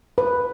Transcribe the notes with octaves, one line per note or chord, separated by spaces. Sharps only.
B4